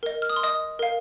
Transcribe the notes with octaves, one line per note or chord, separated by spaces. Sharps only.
A#4 D#5
F6
D#6
C6
D#5 D#6
A#4 F5